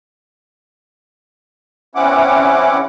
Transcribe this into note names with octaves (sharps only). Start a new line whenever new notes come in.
E2 C4 C#4 E4 F#5 D6